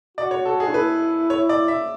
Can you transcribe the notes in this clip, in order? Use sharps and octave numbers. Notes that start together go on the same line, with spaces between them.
F#4 D5
C#5
A4
G#4
D4
E4 B4
C#5
D5
E5